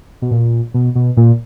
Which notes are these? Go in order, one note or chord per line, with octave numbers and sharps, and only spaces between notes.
B2
A#2
B2
B2
A#2